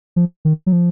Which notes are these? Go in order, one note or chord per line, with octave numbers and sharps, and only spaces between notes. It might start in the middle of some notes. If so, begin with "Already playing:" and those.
F3
D#3
F#3
F3